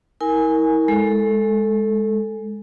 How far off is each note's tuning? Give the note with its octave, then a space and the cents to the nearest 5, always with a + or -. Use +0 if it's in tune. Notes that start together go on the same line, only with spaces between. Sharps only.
E4 -40 A#4 +0 G#5 +0
G#3 +0 A4 +0